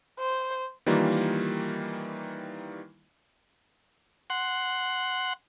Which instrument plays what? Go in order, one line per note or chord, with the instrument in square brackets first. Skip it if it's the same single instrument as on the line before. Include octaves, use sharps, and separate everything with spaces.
[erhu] C5
[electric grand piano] D#3 E3 G3 A#3 F4
[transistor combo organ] F#5 C6